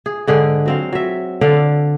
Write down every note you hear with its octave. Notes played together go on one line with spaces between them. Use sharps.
G#4
G#2 D3 G#4 G5
F#3 C4 F5
F#3 E5
D3 D5 F5